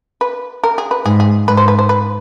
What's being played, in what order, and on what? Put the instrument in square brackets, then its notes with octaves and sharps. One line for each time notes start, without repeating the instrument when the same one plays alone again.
[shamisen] B4
A#4
G#4
B4
[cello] G#2 [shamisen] G#4
[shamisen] G#4
[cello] G#2 [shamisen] B4
[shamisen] C5
B4
C5
B4